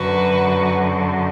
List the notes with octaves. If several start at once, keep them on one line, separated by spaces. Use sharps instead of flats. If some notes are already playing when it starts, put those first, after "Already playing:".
Already playing: F#2 D3 F#4 B4